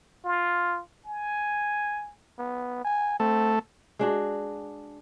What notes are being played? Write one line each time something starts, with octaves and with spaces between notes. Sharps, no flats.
F4
G#5
B3
G#5
A3 C4
G#3 D4 F#4